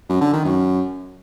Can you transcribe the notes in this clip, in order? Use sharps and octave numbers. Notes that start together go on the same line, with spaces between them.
F#2
D3
D#3
F#2